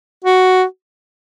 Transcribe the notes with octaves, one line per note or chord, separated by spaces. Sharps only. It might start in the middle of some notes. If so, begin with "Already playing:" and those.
F#4